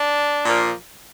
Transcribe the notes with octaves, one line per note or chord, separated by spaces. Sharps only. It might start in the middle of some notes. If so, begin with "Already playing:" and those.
Already playing: D4
A#2 F3 A#3